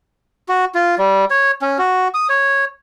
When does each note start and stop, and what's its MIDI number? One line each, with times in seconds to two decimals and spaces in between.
0.49 0.65 66
0.75 0.95 65
0.98 1.25 55
1.30 1.51 73
1.62 1.78 61
1.78 2.08 66
2.14 2.27 87
2.29 2.65 73